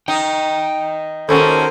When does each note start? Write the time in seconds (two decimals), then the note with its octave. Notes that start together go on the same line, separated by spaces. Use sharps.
0.08 D#4 D#5 G5
1.29 D#2 C#4 F#4 A4 A#4 C5